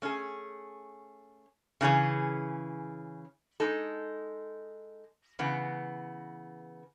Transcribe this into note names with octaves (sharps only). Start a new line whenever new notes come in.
A3 C#4 G#4
C#3 E3 A3 C#4 G#4
G#3 D#4 A4
C#3 E3 B3